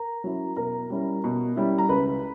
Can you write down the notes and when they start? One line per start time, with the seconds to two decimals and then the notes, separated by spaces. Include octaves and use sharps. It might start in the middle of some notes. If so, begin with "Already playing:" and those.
Already playing: A#4 A#5
0.24 F#3 C#4 E4
0.56 B2 A#4 A#5
0.90 G3 C#4 E4
1.24 B2
1.56 G3 C#4 E4
1.78 A#5
1.89 C#2 B4 B5